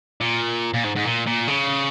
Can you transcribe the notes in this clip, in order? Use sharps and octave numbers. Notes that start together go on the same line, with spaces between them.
A#2
A#2
G#2
G#2
A#2
A#2
C#3